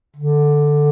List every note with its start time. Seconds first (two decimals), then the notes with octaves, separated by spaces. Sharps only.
0.16 D3